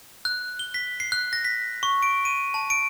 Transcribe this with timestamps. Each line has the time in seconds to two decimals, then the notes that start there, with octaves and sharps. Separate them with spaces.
0.25 F#6
0.59 G7
0.74 B6
1.00 C7
1.12 F#6
1.33 A#6
1.45 B6
1.83 C#6
2.03 D7
2.25 D#7
2.54 A5
2.70 D7